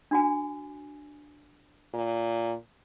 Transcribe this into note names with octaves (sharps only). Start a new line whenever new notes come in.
D4 F#4 G#5
A#2